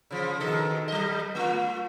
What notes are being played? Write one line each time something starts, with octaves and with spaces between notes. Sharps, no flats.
C#3 F3
B2 D#3 A4
F#3 D#5
A3 F4